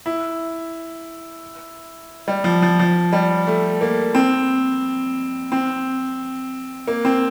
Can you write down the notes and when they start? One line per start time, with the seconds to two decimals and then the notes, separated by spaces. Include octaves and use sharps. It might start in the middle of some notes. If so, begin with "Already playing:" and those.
0.06 E4
2.28 G3
2.44 F3
2.62 F3
2.79 F3
3.13 G3
3.47 A3
3.81 A#3
4.15 C4
5.52 C4
6.88 A#3
7.05 C4